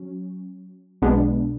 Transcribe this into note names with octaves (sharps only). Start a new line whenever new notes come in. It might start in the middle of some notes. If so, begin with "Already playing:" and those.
Already playing: F#3 C#4
B1 B2 G#3 B3 D4